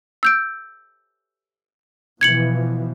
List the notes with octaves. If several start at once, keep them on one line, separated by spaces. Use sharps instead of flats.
E6 G6 D7
B2 E3 F3 G#6 C#7 F#7